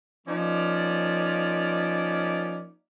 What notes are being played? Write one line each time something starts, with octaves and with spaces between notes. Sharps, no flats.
F3 A#3 C#4 D#4 D5